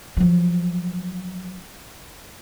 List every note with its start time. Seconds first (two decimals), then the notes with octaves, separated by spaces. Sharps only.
0.17 F3 F#3